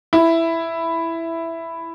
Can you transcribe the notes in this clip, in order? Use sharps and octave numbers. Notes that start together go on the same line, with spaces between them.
E4